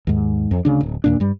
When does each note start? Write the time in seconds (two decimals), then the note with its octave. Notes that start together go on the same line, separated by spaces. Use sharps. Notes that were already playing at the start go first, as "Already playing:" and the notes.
0.07 D#2 G#2
0.51 F2
0.65 D2 C#3 D4
0.81 D1
1.04 D#2 A#2 D4
1.20 G2 G3